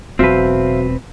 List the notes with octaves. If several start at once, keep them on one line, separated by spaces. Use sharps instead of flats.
E1 B2 F#3 C4 B4 C5 E5 F5